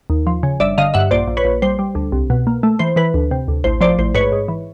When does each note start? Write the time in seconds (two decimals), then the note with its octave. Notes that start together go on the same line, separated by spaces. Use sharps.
0.10 D#2
0.27 F3
0.43 C#3
0.60 G1 D5 E5
0.78 D3 D#5 F5
0.94 G2 E5 F#5
1.11 A#1 C5 D5
1.27 A#1
1.37 B4 C#5
1.45 A#1
1.62 G3 C5
1.79 G3
1.95 D2
2.12 C2
2.30 B2
2.47 A#3
2.63 A3
2.79 E3 C5
2.96 E3 B4
3.14 D2
3.31 C3
3.48 D2
3.64 A1 C5
3.81 F3 C5 D5
3.99 A1 C5
4.15 G#2 B4 C#5
4.32 G#2
4.48 E3